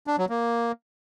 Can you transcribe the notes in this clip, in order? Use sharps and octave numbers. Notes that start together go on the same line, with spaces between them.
D4
F#3
A#3